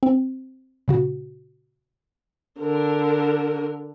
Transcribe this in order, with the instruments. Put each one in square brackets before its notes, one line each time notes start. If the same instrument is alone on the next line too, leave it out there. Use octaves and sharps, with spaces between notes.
[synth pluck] C4
A#2 C#3 F#4
[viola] D3 A#4